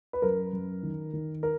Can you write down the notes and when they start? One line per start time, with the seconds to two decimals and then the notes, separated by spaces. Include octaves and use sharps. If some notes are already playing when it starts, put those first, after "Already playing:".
0.13 B4
0.22 F#2 A#4
0.53 F#2
0.83 D#3
1.13 D#3
1.43 A#4